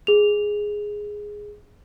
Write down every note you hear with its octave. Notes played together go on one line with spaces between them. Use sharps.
G#4 F7